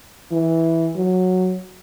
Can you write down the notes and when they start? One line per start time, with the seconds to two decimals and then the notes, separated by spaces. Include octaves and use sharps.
0.31 E3
0.96 F#3